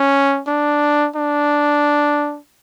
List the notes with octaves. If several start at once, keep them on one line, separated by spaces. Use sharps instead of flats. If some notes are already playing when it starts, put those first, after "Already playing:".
Already playing: C#4
D4
D4